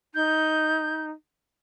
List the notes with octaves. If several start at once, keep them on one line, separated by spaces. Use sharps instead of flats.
D#4 G6